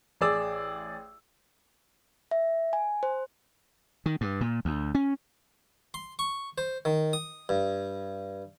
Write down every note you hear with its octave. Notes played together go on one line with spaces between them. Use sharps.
A1 G#4 D5 E6
E5
G#5
C5
D#3
G2
A#2
D2
C#4
C6
C#6
C5
D#3
D#6
G2